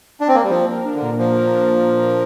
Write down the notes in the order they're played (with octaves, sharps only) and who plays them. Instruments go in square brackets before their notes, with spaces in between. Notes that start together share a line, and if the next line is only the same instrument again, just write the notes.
[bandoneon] D4
C4
A#3
G3
[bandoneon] F3 [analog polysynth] A#3
[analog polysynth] A#4
D4
[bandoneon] D3
[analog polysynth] A#2
[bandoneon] F3 [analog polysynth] A#3
[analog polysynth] A#4
D4
A#2
A#3
A#4